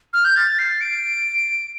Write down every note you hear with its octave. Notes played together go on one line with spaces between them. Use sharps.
F6
G6
A6
C7
D7